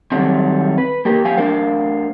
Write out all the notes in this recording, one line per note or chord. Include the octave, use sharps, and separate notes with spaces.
D#3 F#3 G3 A3 C4
B4
A#3 G4 A#4
F2 C4 G4 F5 G#5
A3 D4 A#4 C5 F5